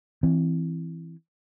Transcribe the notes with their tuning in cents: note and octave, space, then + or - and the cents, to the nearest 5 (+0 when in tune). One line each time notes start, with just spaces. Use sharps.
E3 +0 C4 +0